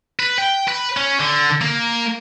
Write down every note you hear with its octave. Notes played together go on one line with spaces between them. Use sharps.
B4
G5
B4
C#4
D3
A#3